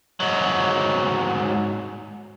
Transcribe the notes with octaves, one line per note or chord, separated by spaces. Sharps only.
G#2 F#3